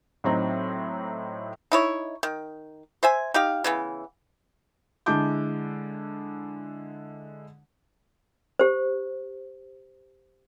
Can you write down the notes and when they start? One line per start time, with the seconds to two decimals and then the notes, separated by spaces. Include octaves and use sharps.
0.24 A2 F#3 C4 D#4
1.72 D#4 E4 C#5
2.23 D#3
3.03 C5 E5 G#5
3.34 D#4 G4 F5
3.64 C#3 E3 B3
5.06 D3 G#3 E4 A5 D6 G6
8.59 G4 C5